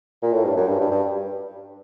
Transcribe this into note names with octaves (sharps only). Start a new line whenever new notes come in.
A#2
A2
G2
F#2
G2
G2
G2